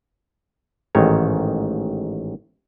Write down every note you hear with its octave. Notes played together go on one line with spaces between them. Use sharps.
A1 G#2 D#3 C#5